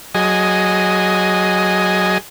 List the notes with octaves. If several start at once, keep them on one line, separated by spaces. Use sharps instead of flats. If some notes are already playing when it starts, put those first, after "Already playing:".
F#3 G#4 D#5